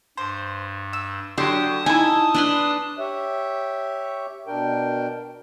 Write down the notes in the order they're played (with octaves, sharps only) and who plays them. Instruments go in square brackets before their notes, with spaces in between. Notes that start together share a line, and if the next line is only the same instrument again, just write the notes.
[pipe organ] G2 [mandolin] C5
[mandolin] E6
[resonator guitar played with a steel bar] D3 F#3 [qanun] G4 [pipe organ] A5 D#6 [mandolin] C6
[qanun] D#4 [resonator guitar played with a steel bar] E4 G#5 [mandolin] A4
[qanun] D4 B4 C6
[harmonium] G4 C#5 E5
B2 D4 A#4 G5